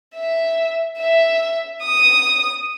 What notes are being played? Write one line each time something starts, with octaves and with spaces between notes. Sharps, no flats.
E5
E5
D#6